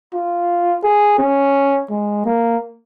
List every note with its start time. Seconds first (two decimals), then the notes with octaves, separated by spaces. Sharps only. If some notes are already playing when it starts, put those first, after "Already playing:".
0.14 F4
0.83 G#4
1.19 C#4
1.90 G#3
2.25 A#3